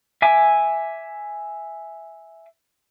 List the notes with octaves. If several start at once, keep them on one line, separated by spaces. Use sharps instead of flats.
E5 G#5 D6